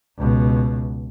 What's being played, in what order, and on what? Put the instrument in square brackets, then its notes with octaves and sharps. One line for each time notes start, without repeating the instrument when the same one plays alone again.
[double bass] C#2 B2